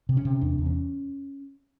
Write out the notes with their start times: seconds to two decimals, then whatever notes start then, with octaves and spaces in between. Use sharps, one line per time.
0.09 C3
0.17 C#4
0.25 C3
0.41 E2 D4
0.58 E2
0.66 C#4